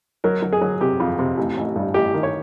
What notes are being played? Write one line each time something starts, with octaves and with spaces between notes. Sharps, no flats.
F#3 A#4
F#3
G#4
F#3
C3 G4
F2
C3
A1
A1
G2
A1 G4
D#3
C#5